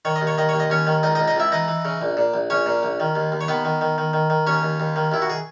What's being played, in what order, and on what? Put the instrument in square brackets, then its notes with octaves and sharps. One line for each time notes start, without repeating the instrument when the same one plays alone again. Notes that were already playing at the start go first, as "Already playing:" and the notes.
[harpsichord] D#3 C#5
D#5
D#2
C#5
D#3 D#5
D#2 C#5
D#5
D#2 C#4 C#5
D#3
C#2 D#4 D#5
D#4 D#5
C#2
D#4 D#5
C#2 E4 E5
E3 D#4 D#5
E3
C#3
A#1
A#2
A#1
A#1 C#4 C#5
A#2
A#1
D#3
D#2
D#2
C#5
D#3 B3 B4
D#3
D#3
D#3
D#3
D#3
D#2 C#4 C#5
D#2
D#2
D#3
D#2 E4
F#4
G#4